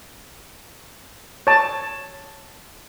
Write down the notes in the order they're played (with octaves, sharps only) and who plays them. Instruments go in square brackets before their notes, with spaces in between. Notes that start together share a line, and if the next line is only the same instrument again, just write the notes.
[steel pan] C#5 A5